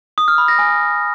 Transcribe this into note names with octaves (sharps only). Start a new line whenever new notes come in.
D#6
F6
B5
A#6
G#5